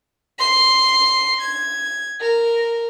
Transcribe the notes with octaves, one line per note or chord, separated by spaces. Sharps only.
C6 C7
G#6
A#4